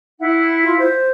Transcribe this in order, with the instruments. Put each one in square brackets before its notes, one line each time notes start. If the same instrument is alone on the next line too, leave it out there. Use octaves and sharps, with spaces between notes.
[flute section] E4 F#5
[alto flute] F4
C5